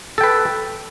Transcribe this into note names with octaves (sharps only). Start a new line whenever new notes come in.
A4 B4 G5